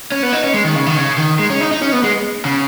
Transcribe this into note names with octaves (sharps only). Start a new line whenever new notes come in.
C#4
B3
D#4
C#4
G#3
D#3
C#3
D#3
C#3
D#3
G#3
C#4
D#4
D#4
C#4
B3
G#3
C#3